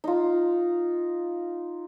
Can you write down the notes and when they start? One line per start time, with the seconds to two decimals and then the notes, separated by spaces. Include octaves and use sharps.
0.04 D#4 F4